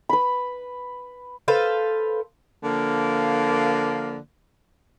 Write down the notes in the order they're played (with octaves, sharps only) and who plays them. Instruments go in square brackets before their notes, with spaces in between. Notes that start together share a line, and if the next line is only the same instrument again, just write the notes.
[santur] B4 B5
[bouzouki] A4 B4 C5 F5
[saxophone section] D3 F3 A#3